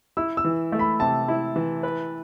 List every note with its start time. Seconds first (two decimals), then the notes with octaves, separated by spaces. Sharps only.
0.17 E4 E6
0.37 E6
0.44 E3
0.72 A3
0.79 B5
1.00 C3 A5
1.28 E4
1.56 E3
1.83 B4